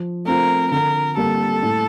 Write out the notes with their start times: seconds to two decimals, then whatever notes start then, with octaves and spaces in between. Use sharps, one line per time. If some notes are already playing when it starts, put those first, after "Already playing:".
Already playing: F3
0.25 A3 C4 F4 A#4
0.71 D3 A#4
1.17 G3 A#3 A4
1.63 A2